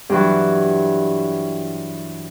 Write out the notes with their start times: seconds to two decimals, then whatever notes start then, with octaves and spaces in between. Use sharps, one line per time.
0.10 G2 E3 F#3